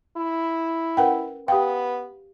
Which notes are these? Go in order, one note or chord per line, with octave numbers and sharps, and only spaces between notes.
E4
C#4 A#4 B4 F#5 G5
B3 G4 F5 G5